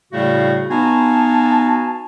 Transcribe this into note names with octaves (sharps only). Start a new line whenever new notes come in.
A2 C#3 G3 A3 F#4 F5
B3 D#4 F#4 F5 G#5 A5